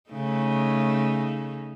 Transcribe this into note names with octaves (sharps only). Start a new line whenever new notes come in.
C#3 A3 D#4